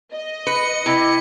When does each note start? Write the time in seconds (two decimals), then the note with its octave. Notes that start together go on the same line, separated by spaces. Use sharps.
0.13 D#5
0.47 B4 C#7
0.86 C3 E4